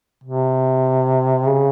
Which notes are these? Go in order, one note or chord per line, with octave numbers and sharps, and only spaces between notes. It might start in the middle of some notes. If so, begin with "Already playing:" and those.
C3
C#3